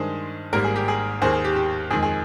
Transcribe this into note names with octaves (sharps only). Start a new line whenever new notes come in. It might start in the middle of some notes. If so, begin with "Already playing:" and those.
Already playing: G2 D#3 G#3 G#4 C5
G#1 G#2 G3 A#3 A#4
G#4
G4
G#4
D#2 D#3 A#3 G#4 C5
G#4
G4
G4
F2 D#3 G#3 G#4
G#4